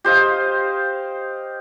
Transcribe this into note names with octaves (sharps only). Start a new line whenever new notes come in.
G4 C5 D#5 F5